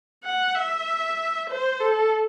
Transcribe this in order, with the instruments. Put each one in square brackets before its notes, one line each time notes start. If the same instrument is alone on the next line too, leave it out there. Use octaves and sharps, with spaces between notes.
[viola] F#5
E5
C5
A4